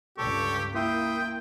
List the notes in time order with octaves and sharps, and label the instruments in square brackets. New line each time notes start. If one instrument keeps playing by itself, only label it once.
[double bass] C#2 G2 [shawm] G4 [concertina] A4 C#6
[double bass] A#3 [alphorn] E4 [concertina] E5 C6 D#6 [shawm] G5